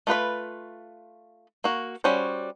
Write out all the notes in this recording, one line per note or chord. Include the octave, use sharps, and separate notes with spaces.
A3 F4 B4 B5
A#3 F#4
G3 C#4 F#4 C5